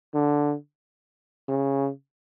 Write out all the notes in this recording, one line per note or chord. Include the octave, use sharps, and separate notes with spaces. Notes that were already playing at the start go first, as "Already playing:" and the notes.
D3
C#3